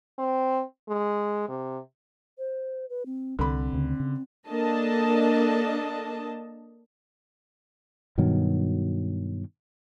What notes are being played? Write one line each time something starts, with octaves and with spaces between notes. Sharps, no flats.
C4
G#3
C3
C5
B4
C4
C2 D3 C4 B5
D2 C#3
C#3
A#3 D4 A4 D#5 A5
G2 B2 D#3 F#3